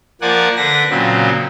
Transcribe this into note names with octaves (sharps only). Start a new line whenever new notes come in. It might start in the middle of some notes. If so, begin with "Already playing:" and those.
F3 A#3 D5 F#5 G#5
D3 D4 B4 A#6
A#2 C#3 F#3 C4